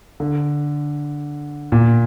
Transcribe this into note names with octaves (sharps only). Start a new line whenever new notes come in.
D3
A#2